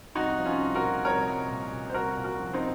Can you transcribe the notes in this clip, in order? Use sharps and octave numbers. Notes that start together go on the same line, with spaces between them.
C2 D#4 F#4
F3
C#4 F4
C2
F#4 A#4
A#2
C2 A#4 C#5
C2
A#2
A#2
C5
C2 F#4 A#4
A#2
F#4 A#4
F3
C4 D#4